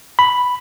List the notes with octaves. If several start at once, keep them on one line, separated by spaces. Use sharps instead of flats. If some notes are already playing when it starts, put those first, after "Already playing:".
B5